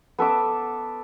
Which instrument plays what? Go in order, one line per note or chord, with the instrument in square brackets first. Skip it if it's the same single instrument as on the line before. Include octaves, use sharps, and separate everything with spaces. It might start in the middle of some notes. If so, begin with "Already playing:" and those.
[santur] B3 A4 E5 D6